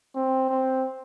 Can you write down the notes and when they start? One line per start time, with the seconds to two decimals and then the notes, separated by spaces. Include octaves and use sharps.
0.15 C4
0.49 C4